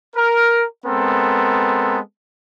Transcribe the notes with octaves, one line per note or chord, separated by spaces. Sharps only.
A#4
G#3 B3 C4 A4 A#4